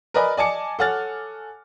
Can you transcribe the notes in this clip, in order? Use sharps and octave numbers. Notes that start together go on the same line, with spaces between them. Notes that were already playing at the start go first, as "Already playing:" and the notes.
A#4 B4 D5 D#5 G#5 B5
D5 D#5 G#5 A5 D6 C#7
A4 C#5 F#5 G#5 F6 A6